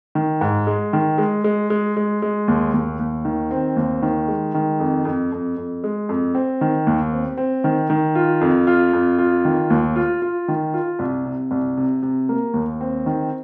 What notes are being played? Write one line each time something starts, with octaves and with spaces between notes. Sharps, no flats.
D#3
G#2
G#3
D#3
G#3
G#3
G#3
G#3
G#3
D#2
D#2
D#2
D#3
C4
D#2
D#3
G#3
D#3
F2
F2
F2
F2
G#3
F2
C4
D#3
D#2
C4
C4
D#3
D#3
F4
F2
F4
F2
F4
D#3
D#2
F4
F4
D#3
F4
C2
C3
C2
C3
C3
A#3
D#2
C4
D#3